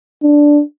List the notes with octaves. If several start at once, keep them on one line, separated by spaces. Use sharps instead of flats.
D4